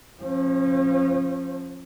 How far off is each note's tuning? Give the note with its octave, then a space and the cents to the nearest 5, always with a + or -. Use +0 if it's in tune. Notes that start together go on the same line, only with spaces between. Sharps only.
F3 +0 C#4 -40